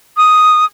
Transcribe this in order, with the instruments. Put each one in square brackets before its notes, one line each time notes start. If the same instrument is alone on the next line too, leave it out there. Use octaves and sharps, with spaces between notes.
[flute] D#6